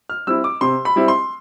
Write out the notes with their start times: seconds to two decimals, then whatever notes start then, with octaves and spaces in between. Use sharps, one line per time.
0.10 F6
0.27 G3 C4 E4 E6
0.44 D6
0.61 C3 C6
0.85 B5
0.96 G3 C4 E4
1.08 C6